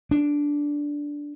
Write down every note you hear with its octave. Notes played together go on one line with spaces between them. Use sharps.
D4